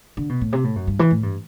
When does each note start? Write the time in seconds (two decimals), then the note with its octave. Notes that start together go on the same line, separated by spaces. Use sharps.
0.17 D3
0.29 B2
0.41 A2
0.52 C3
0.64 A2
0.76 F#2
0.87 G2
0.99 E3
1.11 A2
1.23 G2